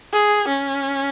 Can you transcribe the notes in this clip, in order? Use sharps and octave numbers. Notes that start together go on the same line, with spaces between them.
G#4
C#4